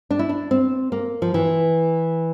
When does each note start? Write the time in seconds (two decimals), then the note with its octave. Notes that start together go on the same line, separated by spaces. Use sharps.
0.11 D4
0.19 E4
0.29 D4
0.51 C4
0.92 A#3
1.22 F3
1.34 E3